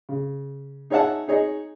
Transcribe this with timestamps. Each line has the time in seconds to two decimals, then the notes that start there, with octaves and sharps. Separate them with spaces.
0.09 C#3
0.90 D#4 G#4 C#5 E5 F#5 A5
1.28 D#4 G#4 C#5 D#5